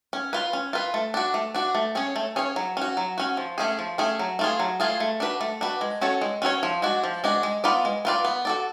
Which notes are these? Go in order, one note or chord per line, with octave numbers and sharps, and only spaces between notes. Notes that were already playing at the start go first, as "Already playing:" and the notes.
C#4
F4 B4
C#4
F4 B4
A3
D4 F#4
A3
D4 F#4
A3
C#4 G#4 C#5
A3
C#4 G#4 C#5
F#3
C#4 F#4
F#3
C#4 F#4
F3
A3 C#4 G#4
F3
A3 C#4 G#4
F#3
A3 F4 G#4
F#3
A3 F4 G#4
A3
D4 F#4 B4
A3
D4 F#4 B4
G#3
C#4 F#4 A4 C#5
G#3
C#4 F#4 A4 C#5
F3
G#3 D4 F#4
F3
G#3 D4 F#4
G#3
B3 F4 B4 D5
G#3
B3 F4 B4 D5
B3
F#4 A4 D5